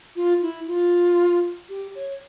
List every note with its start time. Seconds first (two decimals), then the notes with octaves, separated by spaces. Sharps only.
0.16 F4
0.42 E4
0.67 F4
1.69 G4
1.95 C#5